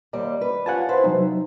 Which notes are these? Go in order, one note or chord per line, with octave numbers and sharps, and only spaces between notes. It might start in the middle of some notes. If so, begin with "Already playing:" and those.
D#2 G3 D5
B4
F4 G4 C#5 F#5 G#5 A5
E4 B4 C5
C3 F#3 D#4